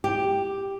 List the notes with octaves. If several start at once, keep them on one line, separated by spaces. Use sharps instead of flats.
G4